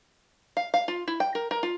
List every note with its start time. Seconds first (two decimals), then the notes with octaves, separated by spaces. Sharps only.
0.57 F5
0.74 F5
0.88 F4
1.08 E4
1.20 G5
1.35 A#4
1.51 A#4
1.63 F4